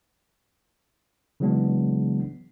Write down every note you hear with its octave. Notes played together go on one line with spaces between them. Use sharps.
C#3 E3 F#3 G#3 B3 D4